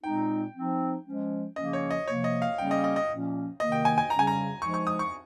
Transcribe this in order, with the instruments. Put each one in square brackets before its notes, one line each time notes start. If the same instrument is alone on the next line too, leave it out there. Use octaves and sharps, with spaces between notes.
[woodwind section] A#2 G#3 C4 D#4 [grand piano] G5
[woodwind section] F3 C4 D#4
F3 G#3 C#4
[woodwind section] C#3 F3 A#3 C#4 [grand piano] D#5
[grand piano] C#5
D#5
[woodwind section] C3 F3 A#3 [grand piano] C#5
[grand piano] D#5
F5
[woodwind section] C#3 G3 A#3 C#4 [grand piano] G5
[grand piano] D#5
D#5
D#5
[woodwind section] A#2 F3 A#3 C#4
[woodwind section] C3 D#3 A#3 [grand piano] D#5
[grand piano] G5
G#5
G#5
[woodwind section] C#3 G3 C#4 [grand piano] A#5
[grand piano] G#5
A#5
[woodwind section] F3 G#3 D#4 [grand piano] C#6
[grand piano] C#6
D#6
C#6